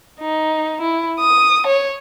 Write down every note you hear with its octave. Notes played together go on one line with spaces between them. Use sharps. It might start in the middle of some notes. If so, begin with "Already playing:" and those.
D#4
E4
D#6
C#5